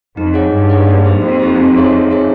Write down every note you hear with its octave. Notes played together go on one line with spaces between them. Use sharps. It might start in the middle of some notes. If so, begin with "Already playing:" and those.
F2 D#4
G#4 C#5 F#5
G2 D#4
G#4 C#5 F#5
A#3
D#4 G4 C5
F2 A#3
D#4 G4 C5
C4
D#4 G#4 C#5 E5
C4
D#4 G#4 C#5 E5